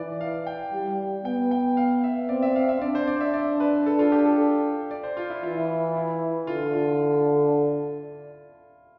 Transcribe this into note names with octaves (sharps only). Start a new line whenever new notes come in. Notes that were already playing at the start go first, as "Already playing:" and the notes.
Already playing: E3 B4 D5
F5
G5
G3
B3 G5
G5
F5
E5
C4 D5
E5
F5
E5
D4 D5
C5
D5
E5
D5
B4
A4
F4
G4
A4
D5
C5
F4
E4
E3 F4
E4
D3 F4
F4